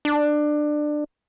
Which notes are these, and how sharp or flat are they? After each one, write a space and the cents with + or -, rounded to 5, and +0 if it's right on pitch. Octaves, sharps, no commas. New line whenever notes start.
D4 +20